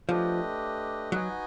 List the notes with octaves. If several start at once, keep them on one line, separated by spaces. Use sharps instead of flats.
F3 A3 D4 G4 B4 D#5
F#3 D#4 F#4 B4 D#5 G#5